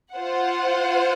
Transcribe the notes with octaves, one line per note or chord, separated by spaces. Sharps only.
F4 C5 F#5